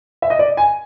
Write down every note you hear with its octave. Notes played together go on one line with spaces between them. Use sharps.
E5
D#5
D5
G#5